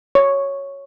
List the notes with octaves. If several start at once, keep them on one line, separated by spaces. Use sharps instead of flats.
C#5